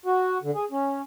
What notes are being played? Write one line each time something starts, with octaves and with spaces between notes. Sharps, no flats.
F#4
D3
G#4
C#4